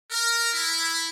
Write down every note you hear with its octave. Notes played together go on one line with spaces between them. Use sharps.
A#4
E4